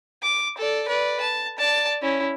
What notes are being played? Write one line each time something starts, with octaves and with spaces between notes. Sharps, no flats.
D6
A4 D5
B4 D5
A5
D5 A5
C#4 E4